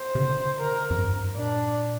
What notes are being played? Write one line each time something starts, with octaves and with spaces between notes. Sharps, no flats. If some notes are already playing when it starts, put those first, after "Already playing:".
Already playing: C5
C3
D3
A#4
F2
G2
A#2 D4